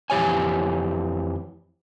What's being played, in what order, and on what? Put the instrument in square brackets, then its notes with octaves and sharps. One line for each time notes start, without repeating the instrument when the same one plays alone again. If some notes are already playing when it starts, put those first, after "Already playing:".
[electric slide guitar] F2 E3 G4 C#5 G#5